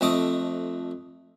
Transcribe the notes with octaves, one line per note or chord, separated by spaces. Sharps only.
F2 A3 D#5 D6